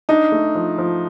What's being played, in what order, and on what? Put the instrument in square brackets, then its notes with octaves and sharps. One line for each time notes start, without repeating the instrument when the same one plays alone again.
[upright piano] D4 [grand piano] D#4
[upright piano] A3
F3
F3